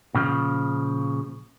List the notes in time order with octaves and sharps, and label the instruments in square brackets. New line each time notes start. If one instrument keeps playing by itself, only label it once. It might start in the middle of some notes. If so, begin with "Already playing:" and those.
[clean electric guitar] A#2 C#3 F3